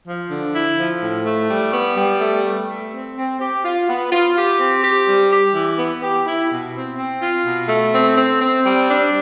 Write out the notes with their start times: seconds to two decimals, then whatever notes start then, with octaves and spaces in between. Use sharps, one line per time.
0.05 F3
0.29 D3
0.53 E4
0.77 F3
1.01 A2
1.25 A3
1.48 G3
1.72 B3
1.96 G3
2.20 A3
2.44 A3
2.68 A3
2.92 C4
3.16 C4
3.39 G4
3.63 F4
3.88 B3
4.11 F4
4.35 G4
4.58 C4
4.82 G4
5.07 G3
5.31 G4
5.54 E3
5.78 B3
6.01 G4
6.25 E4
6.49 B2
6.74 C4
6.97 C4
7.21 F4
7.45 B2
7.69 A3
7.93 C4
8.17 C4
8.41 C4
8.65 G3
8.88 D4